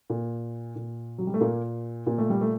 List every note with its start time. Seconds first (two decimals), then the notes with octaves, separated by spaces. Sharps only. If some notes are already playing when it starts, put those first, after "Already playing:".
0.10 A#2
0.76 A#2
1.18 F#3
1.27 G3
1.34 A3
1.41 A#2 A#3
2.06 A#2 A#3
2.18 A3
2.30 G3
2.41 A3